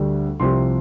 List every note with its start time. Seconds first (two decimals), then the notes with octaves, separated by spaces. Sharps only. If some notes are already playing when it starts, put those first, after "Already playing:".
Already playing: D2 D3 G3
0.40 C2 C3 F3 C6